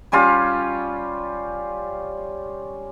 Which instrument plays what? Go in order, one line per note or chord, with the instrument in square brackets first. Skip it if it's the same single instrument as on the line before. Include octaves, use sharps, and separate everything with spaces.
[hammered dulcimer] G3 C#4 F4 G4